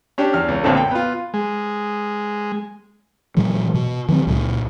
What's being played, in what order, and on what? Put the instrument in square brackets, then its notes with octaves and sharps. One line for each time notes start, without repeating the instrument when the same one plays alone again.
[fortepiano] C#4 D4 G4
E2 F6
C#2
B1 F#2 A#2 D3 C4 A4
G5
B3 F4
[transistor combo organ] G#3
[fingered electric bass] A#2 E3 F#3 G#3
B2
D#3 E3 F#3 C4
C#2 A#2